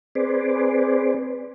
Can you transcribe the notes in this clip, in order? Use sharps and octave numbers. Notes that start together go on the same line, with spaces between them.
C4 G#4 B4 C5 D5